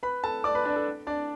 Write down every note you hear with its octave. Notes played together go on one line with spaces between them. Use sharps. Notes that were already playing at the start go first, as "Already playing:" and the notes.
B4 B5
A4 A5
D5 D6
B4 B5
D4 D5
A4
D4 D5